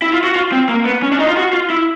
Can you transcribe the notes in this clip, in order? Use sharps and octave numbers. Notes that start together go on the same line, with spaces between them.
E4
F4
F#4
F4
C4
A#3
B3
C#4
D4
D#4
F4
F#4
F4
E4